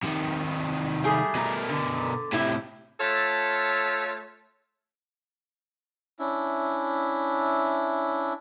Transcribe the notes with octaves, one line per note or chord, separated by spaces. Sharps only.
C3 D#3
G3 A3 G#4
B2 A#4
D3
A2 C3 E4 G4
A3 F4 A4 C#5
C#4 D4 E4 E5